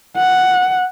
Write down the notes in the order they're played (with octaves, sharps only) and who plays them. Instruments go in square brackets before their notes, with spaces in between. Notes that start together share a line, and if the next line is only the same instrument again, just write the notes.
[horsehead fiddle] F#5